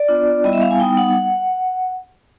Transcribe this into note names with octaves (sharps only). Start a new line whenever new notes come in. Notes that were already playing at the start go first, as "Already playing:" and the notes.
Already playing: D5
B3 D4 F4
G3 B3 E4 D#5
E5
F5
G#5
G3 B3 D#4 G5
F#5